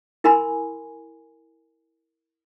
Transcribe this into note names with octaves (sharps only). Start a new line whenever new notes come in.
E4 A#4 G#5 B5 C6